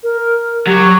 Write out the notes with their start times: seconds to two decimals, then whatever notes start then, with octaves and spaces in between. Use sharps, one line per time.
0.03 A#4
0.67 F#3 G4